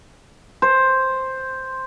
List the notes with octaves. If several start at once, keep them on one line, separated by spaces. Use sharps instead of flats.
C5